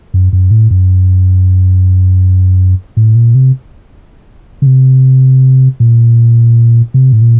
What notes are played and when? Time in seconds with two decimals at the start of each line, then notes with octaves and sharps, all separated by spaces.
0.14 F#2
0.33 F#2
0.51 A2
0.71 F#2
2.97 A2
3.15 A#2
3.35 C3
4.62 C#3
4.66 C3
5.80 A#2
6.94 C3
7.13 A2
7.22 A#2